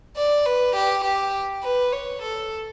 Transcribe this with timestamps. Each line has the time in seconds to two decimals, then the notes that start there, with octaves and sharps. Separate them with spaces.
0.17 D5
0.46 B4
0.76 G4
1.04 G4
1.63 B4
1.92 C#5
2.22 A4